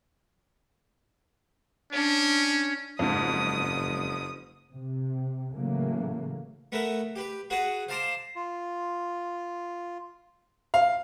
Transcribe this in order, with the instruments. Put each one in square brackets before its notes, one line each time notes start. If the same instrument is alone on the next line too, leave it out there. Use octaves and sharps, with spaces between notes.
[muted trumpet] C#4 [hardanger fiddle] D4
[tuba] F#1 [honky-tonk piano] F2 G#2 [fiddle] D#6
[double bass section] C3
A2 C#3 E3 F#3 A3 A#3
[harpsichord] A3 B3 A#4 B4 E5
G4 B4
F#4 G#4 B4 F#5 G#5
C5 F5 A5 A#5 C6 D6
[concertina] F4
[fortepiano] F5